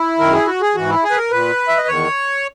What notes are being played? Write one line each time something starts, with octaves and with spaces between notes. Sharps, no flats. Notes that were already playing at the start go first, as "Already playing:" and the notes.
Already playing: E4
F#2 D#3 A#4
G#4
F#4
G#4
G#2 E3 F#4
E4
G#4
B4
A#4
A#2 B4
E5
D#5
E2 D#3 C#5